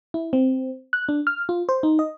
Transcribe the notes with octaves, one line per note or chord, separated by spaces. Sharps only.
E4
C4
F#6
D4
F6
F4
C5
D#4
D#5